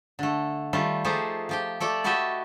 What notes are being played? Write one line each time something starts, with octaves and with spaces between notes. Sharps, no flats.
D3 A3
D#3 G3 A3 F4
F3 A3 D#4 G4 G#4 C5
F3 G4 G5
A3 A4 D5 G5
E4 F#4 G4 A4 D#5 E5